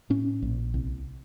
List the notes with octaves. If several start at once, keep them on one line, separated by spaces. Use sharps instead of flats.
A2 C#4
A#1
C2